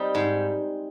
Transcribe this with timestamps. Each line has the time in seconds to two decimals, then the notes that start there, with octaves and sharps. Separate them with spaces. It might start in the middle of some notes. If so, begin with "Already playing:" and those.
Already playing: G3 C4 D#4
0.15 G#2